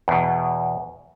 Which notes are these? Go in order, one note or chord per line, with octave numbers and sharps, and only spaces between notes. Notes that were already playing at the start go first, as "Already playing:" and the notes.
E2 B2